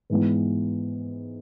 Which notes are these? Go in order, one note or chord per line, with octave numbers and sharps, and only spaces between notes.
G#2 E3 B3